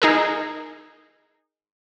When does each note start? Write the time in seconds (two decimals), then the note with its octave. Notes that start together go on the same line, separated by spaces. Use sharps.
0.02 D#4 G#4 A#4